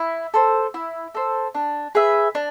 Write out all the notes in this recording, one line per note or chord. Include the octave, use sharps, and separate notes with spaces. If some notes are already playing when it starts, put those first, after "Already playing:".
Already playing: E4
A4 C5
E4
A4 C5
D4
G#4 B4 E5
D4